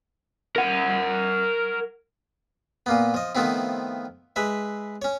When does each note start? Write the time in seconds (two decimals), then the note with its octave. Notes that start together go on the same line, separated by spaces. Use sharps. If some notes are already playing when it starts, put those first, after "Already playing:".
0.56 A#4 F#5
2.86 A#2 A#3 B3
3.14 F3 D#5
3.35 D#3 F3 A3 B3 C4 E4
4.36 G#3 B4 E5
5.02 C#4 C#5